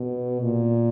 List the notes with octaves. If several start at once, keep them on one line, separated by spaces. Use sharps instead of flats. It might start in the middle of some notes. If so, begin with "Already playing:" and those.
Already playing: B2
A#2